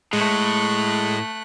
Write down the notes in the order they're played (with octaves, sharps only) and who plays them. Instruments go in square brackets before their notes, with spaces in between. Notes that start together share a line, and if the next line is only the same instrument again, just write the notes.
[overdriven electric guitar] A2 [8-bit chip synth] G#3 [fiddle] A3 F#6